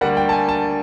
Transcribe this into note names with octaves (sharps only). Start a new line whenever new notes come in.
D2 D3 G3 A#3 F#5
G5
A5
G#5
A5